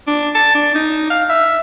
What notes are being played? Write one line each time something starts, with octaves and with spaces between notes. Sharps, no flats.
D4
A5
D4
D#4
F5
E5